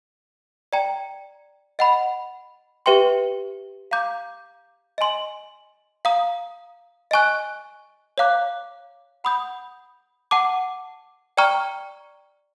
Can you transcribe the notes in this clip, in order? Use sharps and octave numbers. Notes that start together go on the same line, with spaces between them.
D5 G5 A#5
D#5 F#5 B5
G4 B4 E5 G5 C6
F5 A#5 D6 G6
D#5 G#5 C6
F5 A#5 D#6
D#5 G#5 C#6 F#6
C#5 F5 A#5 D6 F#6
F#5 B5 D#6 G6
F#5 A5 D6
D5 G5 A#5 C#6 F6